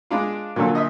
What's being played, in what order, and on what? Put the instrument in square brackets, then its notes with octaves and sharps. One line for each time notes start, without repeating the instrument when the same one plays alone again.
[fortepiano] G#3 D4 F4
[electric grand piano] A#2 D3 [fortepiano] F#3 F4 A4
[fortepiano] D#5 E5